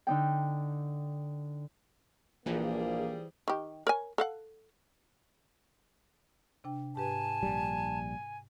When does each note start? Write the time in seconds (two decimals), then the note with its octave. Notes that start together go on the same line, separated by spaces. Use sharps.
0.07 D3 D#4 G5
2.46 A#1 E3 F3 G3 A#3 G#4
3.48 D#3 G4
3.87 A#4 C#5 G#5
4.18 A4 F5 F#5
6.64 C3 D4 G5
6.96 G#2 G4 B4 G#5 A5
7.43 A#1 G3